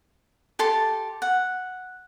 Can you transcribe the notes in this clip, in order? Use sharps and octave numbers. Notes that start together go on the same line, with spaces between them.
G4 A4 A5 C6
F#5